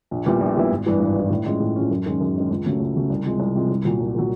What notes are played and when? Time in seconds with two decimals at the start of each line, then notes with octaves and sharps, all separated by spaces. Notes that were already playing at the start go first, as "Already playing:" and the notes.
0.11 A#1
0.26 A#2 G3 B3 E4
0.41 A#1
0.56 A#2 G3 B3 E4
0.71 G#1
0.86 G2 E3
1.00 G#1
1.16 G2 E3
1.30 A2
1.46 F3 G#3 C#4
1.60 A2
1.76 F3 G#3 C#4
1.91 F#2
2.06 D#3 G#3 C#4
2.21 F#2
2.35 D#3 G#3 C#4
2.51 C#2
2.65 C#3 F#3 A3 C#4
2.80 C#2
2.95 C#3 F#3 A3 C#4
3.10 C2
3.26 C3 F3 G#3
3.40 C2
3.55 C3 F3 G#3
3.70 C2
3.85 A#2 F#3
4.00 C2
4.15 A#2 F#3